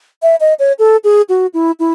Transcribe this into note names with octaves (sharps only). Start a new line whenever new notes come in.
E5
D#5
C#5
A4
G#4
F#4
E4
E4